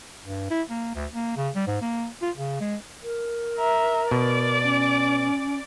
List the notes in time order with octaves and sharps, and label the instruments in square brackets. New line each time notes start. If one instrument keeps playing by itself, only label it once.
[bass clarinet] G2
E4
A#3
D2
A#3
C#3
G3
G#2
A#3
F4
C#3
G#3
[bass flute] A#4
[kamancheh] E5 A#5
[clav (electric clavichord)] B2 [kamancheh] D5 D6
[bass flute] C#4